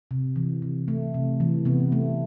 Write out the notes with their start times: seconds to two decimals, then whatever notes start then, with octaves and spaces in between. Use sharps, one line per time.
0.11 C3
0.36 E3
0.62 C3
0.88 A3
1.14 C3
1.40 E3
1.65 C3 B3
1.92 A3